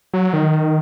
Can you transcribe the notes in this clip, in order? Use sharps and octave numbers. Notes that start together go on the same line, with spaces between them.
F#3
D#3